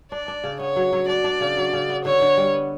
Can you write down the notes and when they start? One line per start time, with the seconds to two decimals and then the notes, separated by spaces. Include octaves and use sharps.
0.12 D4 D5
0.28 D4
0.44 C#3
0.59 B3 C#5
0.76 F#3
0.93 F#3
1.08 D4 D5
1.24 D4
1.41 C#3
1.57 F#3
1.73 C#3
1.89 B3
2.05 D3 C#5
2.21 D3
2.37 G3
2.53 B3